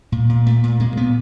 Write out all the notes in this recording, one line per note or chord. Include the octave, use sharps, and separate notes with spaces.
A#2 A#3
A#2
A#2 A3
A#2
A#2 G#3
A#2 B3